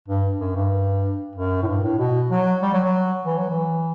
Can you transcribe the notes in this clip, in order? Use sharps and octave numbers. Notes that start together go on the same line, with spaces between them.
G2
F#2
G2
F#2
A2
G2
A2
B2
F#3
G3
F#3
F#3
E3
F#3
E3